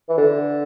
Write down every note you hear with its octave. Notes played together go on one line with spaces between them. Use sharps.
E3
D3